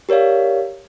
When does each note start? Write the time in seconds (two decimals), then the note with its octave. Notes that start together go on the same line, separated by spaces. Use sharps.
0.09 G4 A#4 C#5 D5 F5